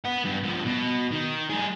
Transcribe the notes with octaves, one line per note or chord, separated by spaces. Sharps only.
B4 F#5
G2
G2 F3
B2
D#3
G3 G#4